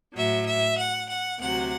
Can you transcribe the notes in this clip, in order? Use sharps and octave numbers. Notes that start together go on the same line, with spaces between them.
A2 F#3 E5
E5
F#5
F#5
D2 C3 F#3 F#5